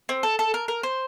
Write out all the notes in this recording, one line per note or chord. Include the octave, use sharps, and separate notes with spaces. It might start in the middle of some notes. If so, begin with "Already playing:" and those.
C4
A4
A4
A#4
A#4
C5